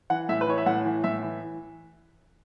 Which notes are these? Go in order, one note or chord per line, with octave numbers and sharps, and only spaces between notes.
E3 F#5
A2 E5
B4
E3 C#5
E5
A2 F#5
E3
A2 E5
E3